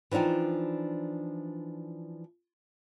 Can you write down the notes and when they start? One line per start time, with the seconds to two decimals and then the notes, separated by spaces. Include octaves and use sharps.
0.11 E3 F3 D4 D#4 G5